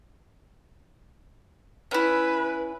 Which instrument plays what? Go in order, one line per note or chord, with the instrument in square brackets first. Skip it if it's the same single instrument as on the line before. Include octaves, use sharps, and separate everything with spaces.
[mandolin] C#4 E4 [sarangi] B4